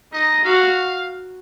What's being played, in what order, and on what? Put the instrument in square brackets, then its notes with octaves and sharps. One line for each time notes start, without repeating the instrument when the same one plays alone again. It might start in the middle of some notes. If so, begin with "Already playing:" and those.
[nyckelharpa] D#4 [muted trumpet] D#5
[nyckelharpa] F#4 [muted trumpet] F5